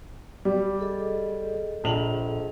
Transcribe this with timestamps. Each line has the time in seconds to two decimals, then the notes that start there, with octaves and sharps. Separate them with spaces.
0.45 G3 D6
0.79 G#4 A4 D#5
1.84 A#1 F7 F#7